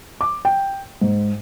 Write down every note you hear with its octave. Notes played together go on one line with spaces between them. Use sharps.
D6
G5
G#2